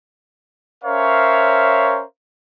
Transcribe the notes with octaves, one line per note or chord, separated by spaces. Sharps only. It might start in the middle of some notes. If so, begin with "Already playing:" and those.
C#4 A#4 C5 C#5 E5 F5